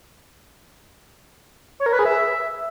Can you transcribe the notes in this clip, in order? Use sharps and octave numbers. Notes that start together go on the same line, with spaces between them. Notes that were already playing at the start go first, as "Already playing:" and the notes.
C#5
A#4
B4
G#4
E5